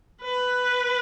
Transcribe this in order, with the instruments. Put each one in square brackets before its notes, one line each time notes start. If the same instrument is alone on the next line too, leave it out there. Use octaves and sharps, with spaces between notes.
[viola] B4